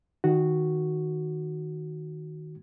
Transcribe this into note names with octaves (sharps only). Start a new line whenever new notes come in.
D#3 F#4